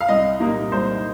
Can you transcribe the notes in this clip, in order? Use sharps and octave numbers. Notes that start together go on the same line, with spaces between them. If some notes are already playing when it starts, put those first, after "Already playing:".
F5
C2 D#5
A#2 G3 A#3 D#4
C2 C5